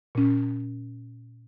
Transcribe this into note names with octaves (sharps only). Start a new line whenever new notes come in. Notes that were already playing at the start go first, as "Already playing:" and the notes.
A#2 C#4